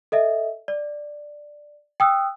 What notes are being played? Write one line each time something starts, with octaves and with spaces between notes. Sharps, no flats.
A4 D#5 E5
D5
G5 D#6 E6 F#6